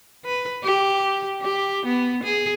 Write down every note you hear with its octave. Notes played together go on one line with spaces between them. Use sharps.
B4
G4
G4
B3
G#4